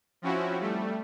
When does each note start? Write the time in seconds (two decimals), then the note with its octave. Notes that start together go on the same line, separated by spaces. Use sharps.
0.22 F3 C4 C#4 E4 F#4
0.60 G3 A3